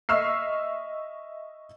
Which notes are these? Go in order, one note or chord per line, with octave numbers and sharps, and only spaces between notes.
D#5 E5 C#6 E6 F6 C7